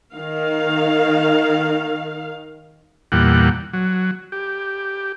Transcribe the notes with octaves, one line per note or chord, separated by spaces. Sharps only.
D#3 F5
E2 A#2 G3 F#5
F#3
G4